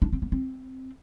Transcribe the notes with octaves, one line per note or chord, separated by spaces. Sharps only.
D4
C4
B3
C4